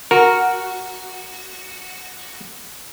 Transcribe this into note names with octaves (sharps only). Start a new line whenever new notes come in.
F#4 A#4